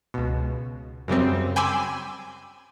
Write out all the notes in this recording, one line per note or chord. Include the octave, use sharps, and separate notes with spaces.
C#2 B2
F#2 C#3 G3 C4
G5 G#5 B5 C6 D6 E6